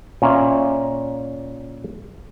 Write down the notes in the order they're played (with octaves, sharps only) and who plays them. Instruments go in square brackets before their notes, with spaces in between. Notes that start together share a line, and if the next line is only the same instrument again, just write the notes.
[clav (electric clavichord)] A#2 C#4 E5